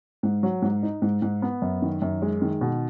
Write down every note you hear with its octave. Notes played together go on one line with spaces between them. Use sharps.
G#2
F#3
G#2
D#4
G#2
G#2
B3
F#2
D#3
F#2
G#3
D#3
B2